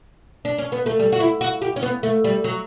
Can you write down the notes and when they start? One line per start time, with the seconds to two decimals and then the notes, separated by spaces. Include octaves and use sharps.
0.45 D4
0.58 C#4
0.72 B3
0.86 A3
1.00 G3
1.12 F#4
1.20 E4
1.41 F#4
1.62 G4
1.76 C#4
1.83 B3
2.03 A3
2.24 G3
2.44 F#3